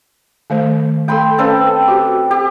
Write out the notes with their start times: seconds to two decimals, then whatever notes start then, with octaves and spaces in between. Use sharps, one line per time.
0.50 D#3 A3 C5
1.08 A3 A4 G5 B5 C6
1.38 C4 C#4 A4 B4 D5 F5
1.88 F#4 G4
2.31 G4